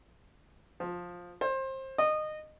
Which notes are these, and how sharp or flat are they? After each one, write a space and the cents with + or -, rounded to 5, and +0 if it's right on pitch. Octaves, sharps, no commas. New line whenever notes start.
F3 +15
C5 +25
D#5 -20